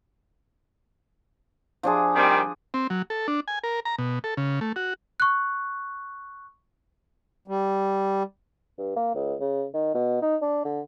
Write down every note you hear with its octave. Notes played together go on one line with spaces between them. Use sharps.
F3 D4 G#4
D#3 G3 C4
C4
F#3
A4
D4
G#5
A#4
A#5
B2
A4
C#3
A3
F#4
C#6 F#6
G3
G2
A#3
C#2
C#3
D#3
B2
D#4
D4
D3